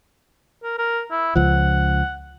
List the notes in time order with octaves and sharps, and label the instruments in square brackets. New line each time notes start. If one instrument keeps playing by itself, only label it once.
[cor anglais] A#4
A#4
E4
[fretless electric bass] C#2 F3 [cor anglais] F#5